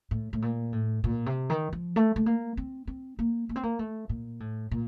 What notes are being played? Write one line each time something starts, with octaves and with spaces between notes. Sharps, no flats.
A2
A2
A#2
A2
A#2
C3
D#3
F3
A3
A3
A#3
C4
C4
A#3
A#3
C4
A#3
A3
A#2
A2
A#2